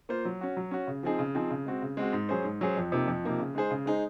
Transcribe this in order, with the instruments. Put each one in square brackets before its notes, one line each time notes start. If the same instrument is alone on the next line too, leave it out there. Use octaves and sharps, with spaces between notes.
[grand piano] A#3 F4 C5
F#3
C#4 F#4
F#3
C#4 F#4
C#3
F3 C4 D#4 G#4
C#3
F3 C4 D#4 G#4
C#3
G#3 C4 F#4
C#3
G#3 C4 F#4
G#2
F#3 C#4 G#4 C5
G#2
F#3 C#4 G#4 C5
F2
C3 F3 A#3 D#4
F2
C3 F3 A#3 D#4
C#3
G#3 D#4 G#4 C5
C#3
G#3 D#4 G#4 C5